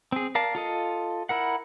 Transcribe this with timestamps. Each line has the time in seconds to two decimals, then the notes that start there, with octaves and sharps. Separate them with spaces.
0.12 C4 G#4
0.35 A#4 D5 F5 A5
0.55 F4 A4 D#5
1.29 E4 A#4 F#5